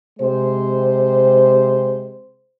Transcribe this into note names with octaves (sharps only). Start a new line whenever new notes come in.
C3 G#3 C5